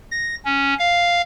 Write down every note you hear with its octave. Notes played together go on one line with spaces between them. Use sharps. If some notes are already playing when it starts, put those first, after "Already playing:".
A#6
C#4
F5